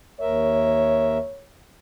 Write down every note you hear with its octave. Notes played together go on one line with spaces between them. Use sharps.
D#2 A#4 C#5 E5